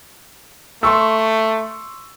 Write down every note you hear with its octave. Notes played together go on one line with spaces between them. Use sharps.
A3 C6 C#6 E6